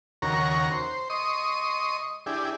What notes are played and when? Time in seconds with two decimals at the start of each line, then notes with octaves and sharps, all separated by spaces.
0.22 D#2 C#3 F#4 A#4 A#5 C#6
0.71 C5
1.10 D#5 C6 C#6 D#6
2.26 D4 E4 G4 G#4